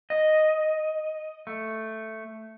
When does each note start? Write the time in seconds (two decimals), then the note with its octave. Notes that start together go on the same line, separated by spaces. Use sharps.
0.10 D#5
1.47 A3